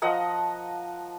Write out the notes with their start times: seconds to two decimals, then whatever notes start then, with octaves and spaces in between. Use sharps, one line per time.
0.02 F3 D#5 F#5 A#5